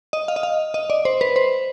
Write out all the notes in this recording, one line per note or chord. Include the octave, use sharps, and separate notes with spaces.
D#5
F5
D#5
F5
D#5
D5
C5
B4
C5